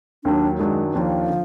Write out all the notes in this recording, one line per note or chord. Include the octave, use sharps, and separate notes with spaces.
D#2 D#3 F#3 D4
F#2 D#3 F#3 G#3 D4
D#2 D#3 F3 A#3 D4
D3